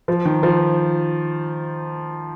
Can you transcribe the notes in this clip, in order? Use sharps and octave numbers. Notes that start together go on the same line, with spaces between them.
F3
D#3
F3